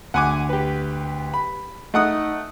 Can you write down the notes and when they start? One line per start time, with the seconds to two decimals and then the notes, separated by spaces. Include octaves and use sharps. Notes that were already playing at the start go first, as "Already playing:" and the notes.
0.14 D2 F#5 G#5 D6
0.49 G4 B4
1.34 B5
1.94 A3 D#4 F#5 D#6